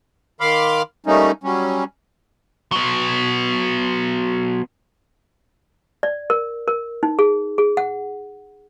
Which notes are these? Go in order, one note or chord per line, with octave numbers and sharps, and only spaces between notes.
D#3 F5 B5 C6 D6 F6
G3 A3 A#3 C#4 D#4
F#3 G3 C#4
F#3 B3
D5
A#4
A#4
D#4
G#4
G#4
F#5